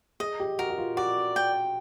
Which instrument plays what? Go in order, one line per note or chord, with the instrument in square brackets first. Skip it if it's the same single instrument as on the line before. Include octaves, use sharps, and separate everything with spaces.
[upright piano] G#4 [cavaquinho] D#5
[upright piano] G4
[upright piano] F#4 [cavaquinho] A#4
[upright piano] F#4
F4
[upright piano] F#4 [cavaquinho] D5
[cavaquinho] G5